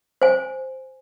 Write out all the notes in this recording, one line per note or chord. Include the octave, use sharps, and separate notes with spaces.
C5 G#5